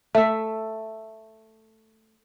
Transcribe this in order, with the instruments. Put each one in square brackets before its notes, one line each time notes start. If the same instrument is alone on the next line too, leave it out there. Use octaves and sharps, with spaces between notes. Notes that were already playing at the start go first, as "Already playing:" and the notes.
[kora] A3 E5